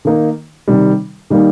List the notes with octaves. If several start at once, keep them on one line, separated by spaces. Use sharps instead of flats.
D#3 A#3 D#4
C3 D#3 G3
D#3 G3 A#3 D#4